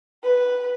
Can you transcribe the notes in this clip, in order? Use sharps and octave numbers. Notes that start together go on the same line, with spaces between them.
B4